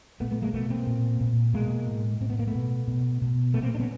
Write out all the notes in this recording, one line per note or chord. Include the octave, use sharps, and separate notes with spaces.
A#2 A3 B3
A3 B3
G#3 A#3
B2 A3 B3
A#3 C4
A#2
A#2
B2 G#3 A#3
A2
A2 C4
B3
A#3
A3 B3
B2
B2
B2
A#2 A3 B3
A#3 C4
D4
B3 C#4